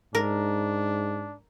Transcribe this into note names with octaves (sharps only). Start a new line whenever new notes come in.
G#2 D4 A#4